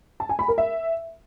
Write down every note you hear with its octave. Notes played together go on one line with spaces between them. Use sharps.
A5
G#5
B5
A#4
E5